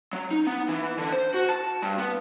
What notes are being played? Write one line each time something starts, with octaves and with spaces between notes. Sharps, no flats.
F#3
D#4
B3
E3
D3
C5
F#4
A5
G2
B3